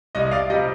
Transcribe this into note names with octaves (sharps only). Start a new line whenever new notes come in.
C2 D#5
D5 F5
C3 G3 D#5